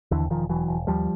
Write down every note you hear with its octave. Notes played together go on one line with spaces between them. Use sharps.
D#2 D3 E3
E1 D#3 F3
E1 E3 F#3
E1
D#2 F3 G3